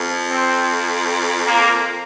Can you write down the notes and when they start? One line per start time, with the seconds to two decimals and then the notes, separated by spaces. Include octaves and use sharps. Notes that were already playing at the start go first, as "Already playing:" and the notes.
Already playing: F2
0.30 C4
1.47 A#3